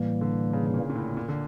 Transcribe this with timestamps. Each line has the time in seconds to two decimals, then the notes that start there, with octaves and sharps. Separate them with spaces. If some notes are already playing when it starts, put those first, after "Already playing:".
Already playing: A2 E3 G3 A#3
0.21 D3
0.53 C#3
0.66 C#3
0.74 A#2
0.90 A#2
0.95 A2
1.17 A#2
1.28 D3